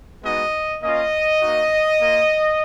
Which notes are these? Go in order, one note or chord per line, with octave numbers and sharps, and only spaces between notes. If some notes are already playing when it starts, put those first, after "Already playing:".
G#3 B3 D#4 F#4 D#5
A#3 C#4 F4 D#5
A#3 D#4 F#4
A#3 F4